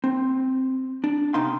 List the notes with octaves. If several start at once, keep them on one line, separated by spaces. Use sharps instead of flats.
C4
D4
C3 B3 D#4 F5 C6